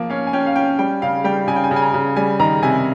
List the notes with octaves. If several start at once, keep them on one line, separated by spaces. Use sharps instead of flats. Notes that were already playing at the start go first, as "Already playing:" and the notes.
Already playing: F3 A#3
C#4 F5
G#5
C#4 G5
F5
C#4 G5
G3 G5
C#3 F5
G3 G5
C#3 G#5
G5
G#5
C#3
G#5
A#5
C#3
G3 G#5
D#3 A#5
C3 G#5